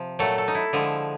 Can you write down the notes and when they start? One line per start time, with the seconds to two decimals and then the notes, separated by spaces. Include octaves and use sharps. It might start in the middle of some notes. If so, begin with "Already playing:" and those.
Already playing: C3 F3
0.19 A#2 F#3 A3 A4
0.38 A4
0.48 D#4
0.55 E4
0.73 D3 F3 G#3